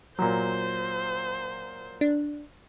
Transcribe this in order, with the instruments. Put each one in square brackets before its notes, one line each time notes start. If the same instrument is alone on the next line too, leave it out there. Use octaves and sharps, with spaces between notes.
[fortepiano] A#2 F#3 [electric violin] C5
[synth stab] D4